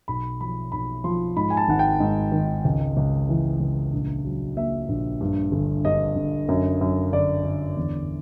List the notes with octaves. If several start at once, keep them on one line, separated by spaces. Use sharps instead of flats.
B1 B5
F3 B5
B1 B5
F3 C6
G#2 B5
G#5
A5
G#1 F#5
G5
G#2
D#3
C#2
C#2
E3
C#2
A#1
F#3
A#2 E5
A#1
G2
G1
G2 D#5
G1
F#2
F#2
G1 D5
G1
E2